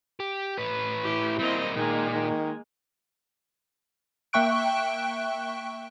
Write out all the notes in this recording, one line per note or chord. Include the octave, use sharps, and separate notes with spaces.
G4
A2 B4
E4 G4
G3 A#3 C4 D#5
A#2 D#3 G#3 A#3
D#3
A#3 E5 G5 C#6 F#6 D7